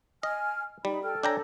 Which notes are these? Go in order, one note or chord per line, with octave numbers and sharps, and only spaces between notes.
D#5 G#5 F6
G3 D#4 B5
A4 G5 F6
D4 C#5 G5 G#5 A#5